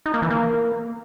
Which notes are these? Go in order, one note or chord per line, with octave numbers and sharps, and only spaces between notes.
D#4
A#3
E3
A#3